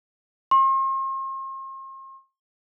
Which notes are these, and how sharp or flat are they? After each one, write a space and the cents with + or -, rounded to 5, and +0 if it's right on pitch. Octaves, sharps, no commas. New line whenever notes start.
C6 +45